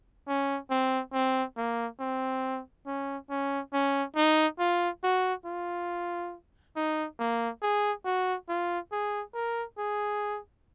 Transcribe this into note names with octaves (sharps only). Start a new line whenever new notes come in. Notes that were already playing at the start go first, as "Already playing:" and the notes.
C#4
C4
C4
A#3
C4
C#4
C#4
C#4
D#4
F4
F#4
F4
D#4
A#3
G#4
F#4
F4
G#4
A#4
G#4